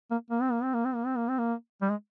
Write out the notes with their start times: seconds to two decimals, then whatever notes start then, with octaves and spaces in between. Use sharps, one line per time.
0.11 A#3
0.30 A#3
0.42 C4
0.51 A#3
0.63 C4
0.74 A#3
0.85 C4
0.95 A#3
1.06 C4
1.17 A#3
1.29 C4
1.39 A#3
1.81 G3
1.89 G#3